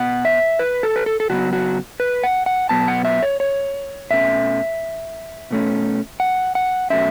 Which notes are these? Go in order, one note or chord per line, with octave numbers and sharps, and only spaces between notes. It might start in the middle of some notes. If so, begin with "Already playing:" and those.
Already playing: B2 B3 F#5
E5
B4
A4
B4
A4
A4
C#3 F#3 B3 F#4
F#4
B4
F#5
F#5
B2 F#3 B3 A5
F#5
E5
C#5
C#5
B2 A3 C#4 E5
B2 A3 C#4
F#5
F#5
B2 F#3 A3 C#4 E5